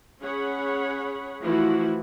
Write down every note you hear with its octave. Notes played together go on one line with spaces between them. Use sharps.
C#4 G#4 C#5 F#5 B5
E3 F3 A3 E4 F#4